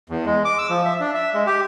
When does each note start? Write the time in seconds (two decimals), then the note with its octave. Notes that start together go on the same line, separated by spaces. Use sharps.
0.09 E2
0.26 G#3
0.45 D6
0.58 E6
0.70 F3
0.85 E5
1.00 D4
1.14 E5
1.34 G#3
1.47 G4